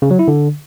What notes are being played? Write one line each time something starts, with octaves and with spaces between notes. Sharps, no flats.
C#3
F#3
E4
D3